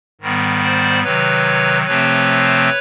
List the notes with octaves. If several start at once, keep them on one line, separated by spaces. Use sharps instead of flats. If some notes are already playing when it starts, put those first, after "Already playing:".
G#2 D#3 G3 B3
C5 D5
C3 D#3 F#3 B4 C#5
C3 F3 A3 C4 B4 C#5